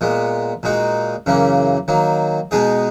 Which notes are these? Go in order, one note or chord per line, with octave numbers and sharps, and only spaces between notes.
A#2 G#3 B3
A#2 G#3 D#4 F#4
F#2 C#3 E3 A#3
D#3 F#3 A#3
B2 G#3 B3 D#4 G#4